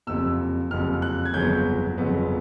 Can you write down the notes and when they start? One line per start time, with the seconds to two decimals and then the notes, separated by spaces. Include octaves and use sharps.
0.07 F#1 F2 C3 E6
0.71 F#1 F2 C3 F6
1.02 F#6
1.25 G#6
1.34 G1 F2 C#3 F#3 B3 G6
1.98 G1 F2 C#3 F#3 B3